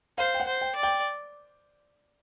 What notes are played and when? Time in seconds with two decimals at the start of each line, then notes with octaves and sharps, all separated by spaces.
0.18 C5 F5
0.34 G5
0.40 F#5
0.47 C5
0.61 G5
0.75 D5
0.83 G5